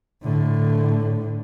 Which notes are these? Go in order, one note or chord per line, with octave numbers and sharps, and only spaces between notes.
A2 D3